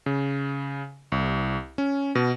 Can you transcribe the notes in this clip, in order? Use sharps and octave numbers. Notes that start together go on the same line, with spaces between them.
C#3
C2
C#4
B2